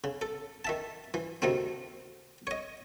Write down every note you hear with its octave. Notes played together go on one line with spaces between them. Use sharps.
C#3
A4
D#3 E5 A5
E3
D2 C3 D#3 A3 C4
C#5 D#5